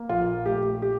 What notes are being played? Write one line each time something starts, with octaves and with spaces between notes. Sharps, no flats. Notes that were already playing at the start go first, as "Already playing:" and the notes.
Already playing: A#3
A#1 F4
A3 G4
G4